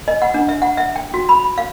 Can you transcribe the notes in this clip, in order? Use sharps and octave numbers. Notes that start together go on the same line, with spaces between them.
D#5
F#5
D4
E5
F#5
E5
G5
F#4
B5
F5